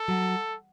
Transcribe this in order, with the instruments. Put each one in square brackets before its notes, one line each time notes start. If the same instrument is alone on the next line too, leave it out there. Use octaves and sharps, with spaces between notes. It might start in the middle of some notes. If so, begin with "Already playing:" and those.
Already playing: [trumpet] A4
[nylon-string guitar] F#3